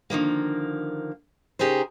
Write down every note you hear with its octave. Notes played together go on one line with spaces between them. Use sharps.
D3 D#3 F3 A#3
C#3 D#4 G4 G#4 A#4 C5